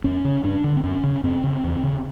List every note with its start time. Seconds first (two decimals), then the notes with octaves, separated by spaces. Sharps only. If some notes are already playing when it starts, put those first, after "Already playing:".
0.04 F2 C#4
0.25 C#3
0.44 G2 D4
0.64 D3
0.76 C4
0.84 F#2 C#4
1.04 C#3
1.23 F#2 C4
1.44 C#3
1.64 E2
1.83 C#3